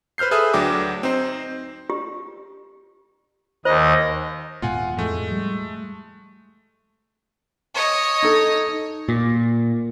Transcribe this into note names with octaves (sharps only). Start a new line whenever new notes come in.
B4 C5 F6 G6 C7
G#4 A4 B4 E5 D#6
D2 F#3 D4 G5 D6
C4 D#4 C5
G4
D#2 C5 D#5
D#1 G#2 B2 F4 F#5 G#5
F2 A2 G#3 A3
G3
C#5 D#5
D#4 A4
A#2